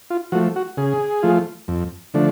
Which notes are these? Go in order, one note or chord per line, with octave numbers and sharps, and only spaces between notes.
F4
F3 A3 F#4
F#4
C#3 G#4
F3 A3 F4
F2
D3 F3 A3 D4